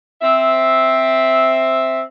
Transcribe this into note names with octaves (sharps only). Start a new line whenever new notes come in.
C4 E5